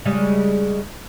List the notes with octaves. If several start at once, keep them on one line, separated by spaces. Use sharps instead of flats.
C#3 G3 G#3